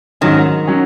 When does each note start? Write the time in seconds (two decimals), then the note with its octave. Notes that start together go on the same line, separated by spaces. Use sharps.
0.21 G#2 D#3 F#3 C#4
0.67 F#3 C#4